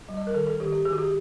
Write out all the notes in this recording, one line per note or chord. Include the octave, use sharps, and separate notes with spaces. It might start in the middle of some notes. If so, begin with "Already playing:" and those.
G3
D#5
A#4
D#3 A4
A4
D#3 G4
G4
D#3 G#4
F#4
G4